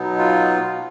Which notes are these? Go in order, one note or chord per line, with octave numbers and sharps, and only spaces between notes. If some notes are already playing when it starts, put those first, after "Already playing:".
Already playing: B2 F#3 B3 D#4
F4